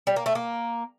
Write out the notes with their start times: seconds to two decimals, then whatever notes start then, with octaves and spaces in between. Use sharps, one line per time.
0.07 G3
0.16 A#3
0.26 A3
0.35 A#3